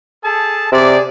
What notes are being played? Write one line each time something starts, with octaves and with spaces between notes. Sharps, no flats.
G#4 A4 A5
C3 G#4 D5